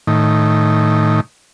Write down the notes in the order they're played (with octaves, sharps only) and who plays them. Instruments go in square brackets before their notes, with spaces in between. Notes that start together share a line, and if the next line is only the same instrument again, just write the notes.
[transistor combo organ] A2 D#3